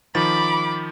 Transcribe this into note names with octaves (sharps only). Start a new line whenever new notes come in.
D#3 F3 B5 D6 A6